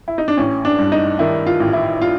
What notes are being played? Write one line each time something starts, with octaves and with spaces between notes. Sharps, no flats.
E4
D#4
D4
A1 C#4
D4
G2
D#4
D#3 E4
F4
A1
E4
F4